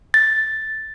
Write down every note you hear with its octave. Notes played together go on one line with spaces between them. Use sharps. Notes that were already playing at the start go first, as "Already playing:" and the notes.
A6